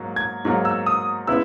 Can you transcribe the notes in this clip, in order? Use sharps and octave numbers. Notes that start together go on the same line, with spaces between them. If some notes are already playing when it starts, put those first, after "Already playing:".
Already playing: G#2 F#3 A#3
G#6
G#2 F#3 A#3
E6
D#6
C#3 G#3 B3 E4 E6